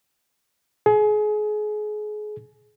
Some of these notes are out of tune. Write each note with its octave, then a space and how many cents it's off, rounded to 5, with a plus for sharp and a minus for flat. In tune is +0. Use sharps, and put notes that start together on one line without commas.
G#4 +30